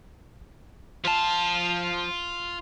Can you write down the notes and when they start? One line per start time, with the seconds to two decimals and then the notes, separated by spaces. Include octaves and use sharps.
1.05 F3 F4 A5